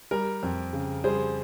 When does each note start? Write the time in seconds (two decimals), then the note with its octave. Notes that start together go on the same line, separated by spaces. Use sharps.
0.11 G3 A#4
0.43 F2
0.73 C#3
1.04 G3 G#4 C5